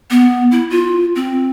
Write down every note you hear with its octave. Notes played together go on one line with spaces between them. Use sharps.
B3
E4
F4
C4